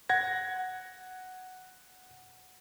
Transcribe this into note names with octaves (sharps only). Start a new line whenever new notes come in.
F#5 G#6 A#6